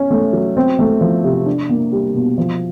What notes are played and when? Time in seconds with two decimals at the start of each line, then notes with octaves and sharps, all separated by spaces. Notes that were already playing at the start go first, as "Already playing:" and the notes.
Already playing: C#4
0.11 A3
0.33 F#3
0.57 C4
0.79 A3
1.01 F3
1.24 C3
1.46 D4
1.69 A#3
1.92 G3
2.14 B2
2.38 F3